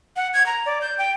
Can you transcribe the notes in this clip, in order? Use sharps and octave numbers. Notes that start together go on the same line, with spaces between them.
F#5
G#6
A#5
D5
G6
G5